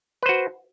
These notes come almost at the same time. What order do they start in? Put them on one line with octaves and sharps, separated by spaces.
B4 C5 F#4